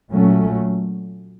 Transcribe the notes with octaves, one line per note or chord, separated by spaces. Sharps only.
A#2 F#3 A3 C#4